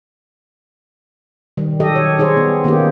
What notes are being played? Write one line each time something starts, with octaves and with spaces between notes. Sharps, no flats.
D#3 G3
F#3 G4 A4 D#5
C#5
G3 D#4 G#4 C5 C#5
B3
D#3 A#3 B3 C#4 G4